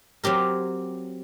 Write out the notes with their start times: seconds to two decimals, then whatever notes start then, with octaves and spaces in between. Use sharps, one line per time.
0.24 F#3 C4 G4 A#4